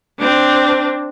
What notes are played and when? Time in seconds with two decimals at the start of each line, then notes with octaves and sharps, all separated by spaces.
0.19 C4 D4